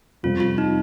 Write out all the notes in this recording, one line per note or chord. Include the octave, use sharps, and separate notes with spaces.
F2 C3 G3 C4 F4
F4
D#4